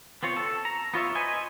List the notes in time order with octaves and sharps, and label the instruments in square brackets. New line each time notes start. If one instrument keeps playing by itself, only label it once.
[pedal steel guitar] B3 C4 F4 C#5
A4
A#5
B3 F4 C#5 E5
B4 C5 D#5 G#5